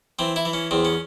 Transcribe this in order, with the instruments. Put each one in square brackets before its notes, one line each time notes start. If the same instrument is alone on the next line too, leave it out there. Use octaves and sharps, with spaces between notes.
[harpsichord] E3 C4
E4
E3
C#4
E2 C4
C#4